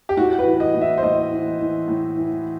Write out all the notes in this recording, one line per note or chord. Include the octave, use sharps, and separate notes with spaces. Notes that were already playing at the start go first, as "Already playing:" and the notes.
G4
A2 F#4
B4
E3
D#5
A2
E5
C5
A2 D#5
E3
E3
A2
E3